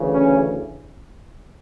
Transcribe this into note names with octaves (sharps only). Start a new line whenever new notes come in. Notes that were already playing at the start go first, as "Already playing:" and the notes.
Already playing: D2 C#3 E3
C#4